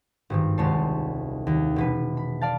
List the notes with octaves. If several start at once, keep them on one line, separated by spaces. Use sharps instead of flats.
G#1 G2 D#3
D#1 C2 G#3 C#5 A5 C6
D#2
E1 B2 B4
B5
D5 F5 A5